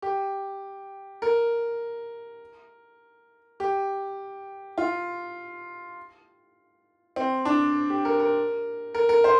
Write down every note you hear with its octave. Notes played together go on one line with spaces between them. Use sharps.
G4
A#4
G4
F4
C4
D4
G4
A#4
A#4
A#4
A#4
C5